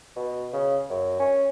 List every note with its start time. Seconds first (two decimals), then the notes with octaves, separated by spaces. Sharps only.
0.16 B2
0.53 C#3
0.90 F#2
1.20 C#4